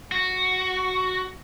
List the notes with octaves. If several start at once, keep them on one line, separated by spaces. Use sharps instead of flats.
F#4